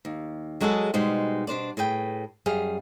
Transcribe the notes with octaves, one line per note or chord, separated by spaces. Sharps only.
D#2
F#3 G#3 F#4 G#4 A4
B2 G3 G#3 D#4 C5
B2 D4 C5 D5
A2 G#4 B4 G5
F#2 G3 G#4 F5